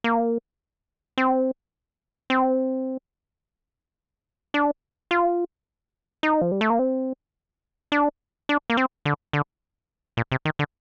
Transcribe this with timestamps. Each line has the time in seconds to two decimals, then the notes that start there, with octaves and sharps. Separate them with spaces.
0.04 A#3
1.18 C4
2.30 C4
4.54 D4
5.11 F4
6.23 D#4
6.42 F3
6.52 G3
6.61 A3
6.70 A#3
6.79 C4
7.92 D4
8.49 D4
8.70 A#3
8.77 C4
9.05 D3
9.33 D3
10.17 A#2
10.32 C3
10.45 D#3
10.59 D3